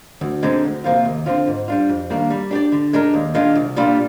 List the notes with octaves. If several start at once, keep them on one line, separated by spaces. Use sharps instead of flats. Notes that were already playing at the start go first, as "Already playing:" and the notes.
D2
D3 G#3 C4 D#4
D2
C3 F3 A#3 F4
D#2
D3 F3 C4 F4
G#2
G3 D4 F4
F2
D#3 G3 A#3 D4
G3
D4 G4 D5
D3
G#3 D4 G4 A#4
D#2
D#3 G#3 D4 F4
C2
A#2 G3 D4 F4